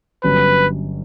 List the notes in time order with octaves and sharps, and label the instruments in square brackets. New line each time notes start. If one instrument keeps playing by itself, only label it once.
[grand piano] G1 G2 D3 F#3 C#4 [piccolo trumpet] B4